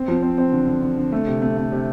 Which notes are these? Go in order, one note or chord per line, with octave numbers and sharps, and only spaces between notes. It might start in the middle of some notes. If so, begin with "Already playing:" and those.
Already playing: C4
F3
C4
C4
D3
D3
D3
D3
A3
C3
A3
A3
C3